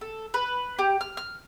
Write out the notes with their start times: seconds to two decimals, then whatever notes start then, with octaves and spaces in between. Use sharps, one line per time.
0.01 A4
0.34 B4
0.79 G4
1.01 F6
1.17 F6